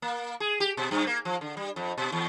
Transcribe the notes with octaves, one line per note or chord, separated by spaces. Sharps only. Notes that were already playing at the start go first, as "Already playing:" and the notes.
A#3
G#4
G4
B2
G2
A#3
F3
D3
G3
F2
B2
E2